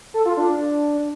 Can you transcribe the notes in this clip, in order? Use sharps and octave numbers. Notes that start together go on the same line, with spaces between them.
A4
F4
D4